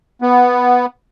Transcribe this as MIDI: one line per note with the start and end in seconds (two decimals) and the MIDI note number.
0.22 0.86 59